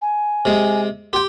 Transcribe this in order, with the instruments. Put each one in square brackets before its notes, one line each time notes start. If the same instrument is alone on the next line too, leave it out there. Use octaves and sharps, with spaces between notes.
[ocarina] G#5
[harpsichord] C3 G#3
[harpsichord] G4 G5 [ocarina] C6